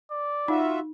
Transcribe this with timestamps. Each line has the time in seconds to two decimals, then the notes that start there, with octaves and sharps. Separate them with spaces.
0.11 D5
0.48 D#4 F4 F#4 E5